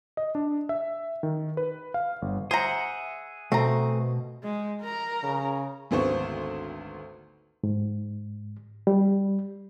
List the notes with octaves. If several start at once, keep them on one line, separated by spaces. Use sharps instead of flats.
D#5
D4
E5
D#3
B4
F5
G1
G#4 C5 E5 F#5 A#5
B2 A3 C4 A#5
G#3
A#4 A#5
C#3
G#1 D2 B3 C5 C#6
G#2
G3